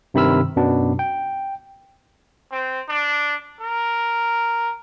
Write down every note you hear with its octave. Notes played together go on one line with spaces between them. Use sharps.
G2 C3 D#3 B5 E6 F6
F#2 B2 F#3 B3 D4
G5
C4
D4
A#4